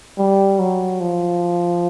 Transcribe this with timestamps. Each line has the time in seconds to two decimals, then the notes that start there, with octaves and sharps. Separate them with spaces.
0.18 G3
0.59 F#3
1.00 F3